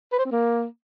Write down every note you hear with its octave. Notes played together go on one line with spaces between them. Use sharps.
B4
C5
C4
A#3